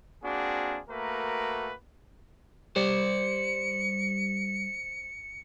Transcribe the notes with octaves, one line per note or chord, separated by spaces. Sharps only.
A#3 C4 D4 F#4 G#4
A3 A#3 F#4 A#4 B4
G3 C5 D5 C#7